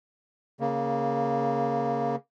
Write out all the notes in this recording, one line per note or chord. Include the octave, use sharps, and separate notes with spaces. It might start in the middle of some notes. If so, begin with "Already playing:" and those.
C#3 A#3